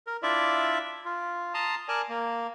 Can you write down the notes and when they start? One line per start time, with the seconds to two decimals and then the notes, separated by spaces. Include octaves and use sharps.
0.07 A#4
0.23 D4 E4 F4 D5 E5
1.05 F4
1.54 A5 A#5 C6 D#6
1.89 A#4 D5 G#5 A5
2.09 A#3